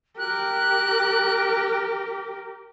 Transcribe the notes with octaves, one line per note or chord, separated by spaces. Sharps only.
G4 A#4 F#6